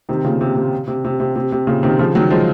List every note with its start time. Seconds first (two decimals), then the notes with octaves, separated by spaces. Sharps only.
0.09 C3 D#3
0.25 A#2 C#3
0.41 C3
0.56 C3
0.87 C3
1.05 C3
1.20 C3
1.36 C3
1.52 C3
1.67 A#2 C#3
1.83 C3 D#3
1.99 C#3 F3
2.15 D#3 F#3
2.30 F3 G#3